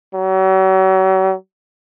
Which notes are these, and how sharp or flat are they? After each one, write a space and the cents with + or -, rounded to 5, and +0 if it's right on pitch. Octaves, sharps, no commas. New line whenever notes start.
F#3 +40